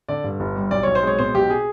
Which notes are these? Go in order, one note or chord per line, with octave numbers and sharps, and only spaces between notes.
D3 D5
G2
G1
G3
B1 D5
B1 C#5
C5
G#3 C#5
B2 C5
B1 G4
G#4